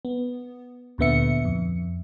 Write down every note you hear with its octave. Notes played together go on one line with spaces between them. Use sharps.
B3
D2 A#2 D3 B3 E5 C#7
F2